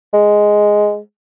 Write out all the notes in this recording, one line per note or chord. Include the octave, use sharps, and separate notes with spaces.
G#3